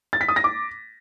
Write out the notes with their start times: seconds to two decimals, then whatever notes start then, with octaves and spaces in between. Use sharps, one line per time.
0.13 A6
0.21 B6
0.28 D#6
0.36 A#6
0.44 D6